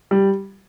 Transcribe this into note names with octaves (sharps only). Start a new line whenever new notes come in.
G3